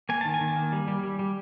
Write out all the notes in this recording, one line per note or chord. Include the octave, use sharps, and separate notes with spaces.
A#3 G#5
D#3 A5
G#5
D#3
A#3
G3
G3
G3
G3